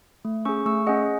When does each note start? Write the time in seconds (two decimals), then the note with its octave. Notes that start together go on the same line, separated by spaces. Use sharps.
0.25 A3
0.45 C#4 G#4 C#6 E6
0.66 A3 C#6 E6
0.87 C#4 G#4 D#5 F#5